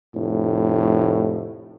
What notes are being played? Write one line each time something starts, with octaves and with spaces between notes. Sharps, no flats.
F1 A2